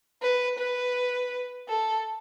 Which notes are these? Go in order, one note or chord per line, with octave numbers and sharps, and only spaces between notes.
B4
B4
A4